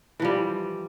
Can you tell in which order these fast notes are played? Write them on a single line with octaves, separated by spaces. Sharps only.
E3 F3 G3